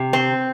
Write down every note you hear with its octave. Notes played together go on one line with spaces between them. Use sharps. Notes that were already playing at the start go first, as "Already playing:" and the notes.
Already playing: C3
C4